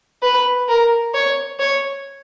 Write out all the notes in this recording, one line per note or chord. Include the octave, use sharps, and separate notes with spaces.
B4
A#4
C#5
C#5